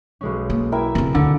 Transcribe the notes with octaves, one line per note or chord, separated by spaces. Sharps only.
B1 G#3 C#4
A#3
E4 A#4 E5 G5 G#5
C#3 C4
D2 D3